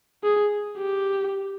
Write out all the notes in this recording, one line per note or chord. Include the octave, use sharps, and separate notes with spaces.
G#4
G4